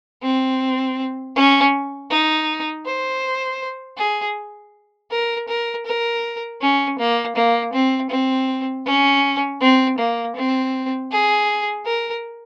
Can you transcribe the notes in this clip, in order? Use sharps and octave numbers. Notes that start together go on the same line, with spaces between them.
C4
C#4
D#4
C5
G#4
A#4
A#4
A#4
C#4
A#3
A#3
C4
C4
C#4
C4
A#3
C4
G#4
A#4